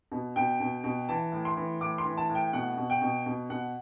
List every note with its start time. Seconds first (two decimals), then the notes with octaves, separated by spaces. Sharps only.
0.12 B2
0.36 B2 G5
0.60 B2
0.84 B2
1.09 E3 A5
1.32 A2
1.45 C6
1.57 E3
1.81 A2 D6
1.98 C6
2.05 E3
2.18 A5
2.29 A2
2.35 G5
2.53 B2 F#5
2.77 B2
2.90 G5
3.01 B2
3.26 B2
3.50 B2 F#5